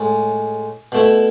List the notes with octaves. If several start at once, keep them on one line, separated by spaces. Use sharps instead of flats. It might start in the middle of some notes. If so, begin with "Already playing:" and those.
Already playing: A2 G#3 C#4
B2 A3 E4